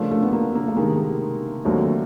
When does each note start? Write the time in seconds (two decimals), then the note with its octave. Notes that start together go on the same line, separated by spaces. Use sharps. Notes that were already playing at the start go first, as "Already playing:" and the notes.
Already playing: C#3 F3 A3 A#3 D4
0.11 A3
0.23 B3
0.33 A#3
0.55 A#3
0.68 A3
0.76 C3 D#3 G#3 A#3
1.65 D#2 D3 F#3 A3 C4